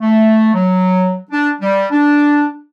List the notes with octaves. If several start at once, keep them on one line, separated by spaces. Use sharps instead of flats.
A3
F#3
D4
G3
D4